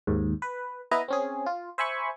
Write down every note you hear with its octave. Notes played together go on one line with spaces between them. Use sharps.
D#2 G#2
B4
B3 E4 B4 D#5 A#5
C4 C#4 G#4
F4
C5 E5 G#5 B5 C#6